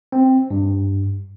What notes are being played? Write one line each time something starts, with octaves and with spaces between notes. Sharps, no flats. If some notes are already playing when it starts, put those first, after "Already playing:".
C4
G2